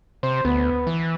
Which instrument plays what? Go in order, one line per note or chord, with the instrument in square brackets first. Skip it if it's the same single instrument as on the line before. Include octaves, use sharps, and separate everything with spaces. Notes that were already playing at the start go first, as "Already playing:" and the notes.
[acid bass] C3 [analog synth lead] C5
[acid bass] D2 [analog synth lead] B3
[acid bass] E3